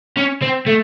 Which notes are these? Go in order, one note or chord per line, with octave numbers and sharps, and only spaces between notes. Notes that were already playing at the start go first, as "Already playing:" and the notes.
C#4
C4
A3